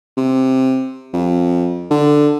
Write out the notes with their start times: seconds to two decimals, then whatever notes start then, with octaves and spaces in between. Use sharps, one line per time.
0.17 C3
1.13 F2
1.91 D3